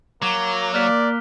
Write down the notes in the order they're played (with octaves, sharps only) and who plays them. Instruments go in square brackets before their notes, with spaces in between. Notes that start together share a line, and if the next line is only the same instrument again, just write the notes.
[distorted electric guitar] F#3 [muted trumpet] A#3 [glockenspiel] D6 F7 G7
[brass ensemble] A#3 [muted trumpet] D5 [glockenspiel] F6 F#6 B6